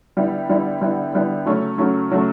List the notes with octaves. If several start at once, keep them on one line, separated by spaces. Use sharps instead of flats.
D3 G3 B3 E4
D3 G3 B3 E4
D3 G3 B3 E4
D3 G3 B3 E4
C#3 F#3 A3 C#4
C#3 F#3 A3 C#4
C#3 F#3 A3 C#4